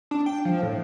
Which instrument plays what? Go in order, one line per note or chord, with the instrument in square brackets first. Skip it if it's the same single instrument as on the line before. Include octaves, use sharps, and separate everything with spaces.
[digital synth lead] D4
G5
F3
A2